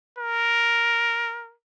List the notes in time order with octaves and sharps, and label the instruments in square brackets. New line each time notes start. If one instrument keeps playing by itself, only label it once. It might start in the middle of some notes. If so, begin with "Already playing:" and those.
[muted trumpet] A#4